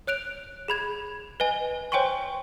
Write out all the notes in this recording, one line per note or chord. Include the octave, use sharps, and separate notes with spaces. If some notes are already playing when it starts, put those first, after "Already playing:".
C#5 F#6 D7 F7
G#4 B5 G#6 E7
B4 D#5 G#5
C5 C#5 G5 G#5 C6 C#6